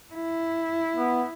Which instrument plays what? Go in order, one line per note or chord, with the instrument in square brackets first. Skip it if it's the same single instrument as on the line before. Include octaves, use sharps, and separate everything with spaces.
[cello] E4
[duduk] B3